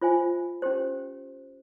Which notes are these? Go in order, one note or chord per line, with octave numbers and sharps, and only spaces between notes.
F4 C5 E5 G#5
C#4 G4 C5